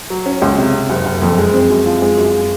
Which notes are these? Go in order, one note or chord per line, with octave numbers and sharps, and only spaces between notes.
F#3
C#4
C#2
C3
C3
F#1
F#1
F2
G#3
C4
F#2
F3
G#3
F#2